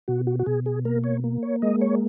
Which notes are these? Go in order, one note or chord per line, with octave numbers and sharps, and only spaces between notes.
B2 F#4
F#4
F#4
B2 G#4
G#4
A#3 A#4
C#5
A#3
C#5
G#3 D#5
C#5